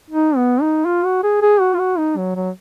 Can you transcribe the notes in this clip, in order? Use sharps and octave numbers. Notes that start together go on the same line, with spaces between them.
D#4
B3
D#4
F4
F#4
G#4
G#4
F#4
F4
F#4
D#4
F#3
F#3